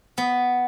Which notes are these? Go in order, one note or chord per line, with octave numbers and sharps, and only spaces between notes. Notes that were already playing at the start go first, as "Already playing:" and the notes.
B3